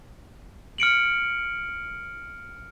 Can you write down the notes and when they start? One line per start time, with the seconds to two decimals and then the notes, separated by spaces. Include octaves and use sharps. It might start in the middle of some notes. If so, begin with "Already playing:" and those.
0.78 F6 C#7 D7 F#7